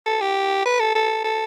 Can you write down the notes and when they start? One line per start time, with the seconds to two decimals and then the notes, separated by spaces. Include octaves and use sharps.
0.06 A4
0.21 G4
0.66 B4
0.80 A4
0.95 A4
1.24 A4